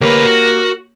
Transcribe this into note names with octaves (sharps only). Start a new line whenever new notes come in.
D2 A#3 G4 A#4 B4 C#5
F#4